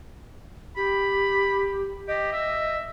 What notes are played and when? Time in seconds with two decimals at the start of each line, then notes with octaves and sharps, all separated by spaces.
0.77 G4 B5
2.08 G4 D#5
2.32 E5